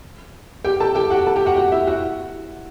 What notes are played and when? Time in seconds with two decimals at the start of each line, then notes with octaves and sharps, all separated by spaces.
0.64 G4 G5
0.80 A4 A5
0.95 G4 G5
1.10 F#4 F#5
1.26 A4 A5
1.36 G4 G5
1.46 F#4 F#5
1.56 F#4 F#5
1.72 E4 E5
1.87 F#4 F#5